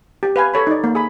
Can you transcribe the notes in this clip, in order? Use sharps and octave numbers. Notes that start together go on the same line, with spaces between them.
G4
B4 F5 G#5
A4 C#5 B5
D#4 D5
A#3
G#4 B5